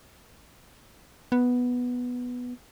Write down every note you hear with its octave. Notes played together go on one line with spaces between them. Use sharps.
B3